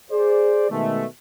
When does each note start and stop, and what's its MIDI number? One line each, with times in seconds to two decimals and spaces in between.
0.11 0.69 68
0.11 0.69 72
0.11 0.69 74
0.70 1.04 47
0.70 1.04 51
0.70 1.04 56
0.70 1.04 57